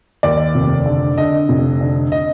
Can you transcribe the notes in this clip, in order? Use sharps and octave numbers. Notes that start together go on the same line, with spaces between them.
D#2 D5
F1
D3
D3 D#5
F1
D3
D#5